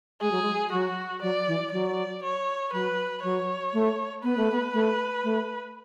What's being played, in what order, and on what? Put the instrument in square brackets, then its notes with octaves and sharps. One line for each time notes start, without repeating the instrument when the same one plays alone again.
[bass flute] G#3 [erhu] G#4
[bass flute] F#3
G#3
[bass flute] F#3 [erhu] F#4
[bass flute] F#3 [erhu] D5
[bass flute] E3
[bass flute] F#3 [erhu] D5
[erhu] C#5
[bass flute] F#3 [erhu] B4
[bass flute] F#3 [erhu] C#5
[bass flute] A3
[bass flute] B3 [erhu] B4
[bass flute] A3
B3
A3
A3